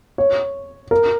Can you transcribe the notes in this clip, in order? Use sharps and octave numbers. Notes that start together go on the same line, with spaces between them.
C#5
A#4